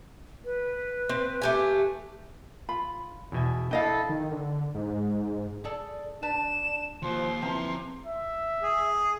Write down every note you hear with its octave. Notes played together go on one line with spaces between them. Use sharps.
B4
C4
A3 G4 G#5
F4 B5
E2 B2 E4 G#5
D4 E4 A4 D#5 F5 G5
D#3
D3
G#2
G#4 A4 D5
D4 B4 A5 E7
D#2 F3 C6
E3 F3 C4 A#5
E5
G#4